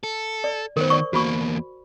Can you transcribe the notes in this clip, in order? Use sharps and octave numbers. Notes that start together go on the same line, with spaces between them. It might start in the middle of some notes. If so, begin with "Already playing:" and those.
A4
D5
D#3 B3 A#4 C5
D5 C#6
E2 A#3 F#4 B5 C#6